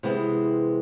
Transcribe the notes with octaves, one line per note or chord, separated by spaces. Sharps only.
C3 E3 G#3 B3 C4